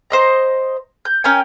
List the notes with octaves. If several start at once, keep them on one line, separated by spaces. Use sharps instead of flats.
C5 D#5 A#5
G6
C#4 A#4 G5 G#5